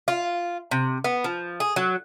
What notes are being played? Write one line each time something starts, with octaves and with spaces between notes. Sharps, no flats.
F4
C3
B3
F3
G#4
F#3